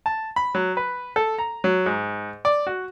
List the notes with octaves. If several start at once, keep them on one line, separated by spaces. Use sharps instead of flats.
A5
B5
F#3
B4
A4
A#5
F#3
G#2
D5
F#4